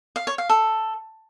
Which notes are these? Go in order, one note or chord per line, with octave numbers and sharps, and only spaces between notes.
F5
C#5
F5
A4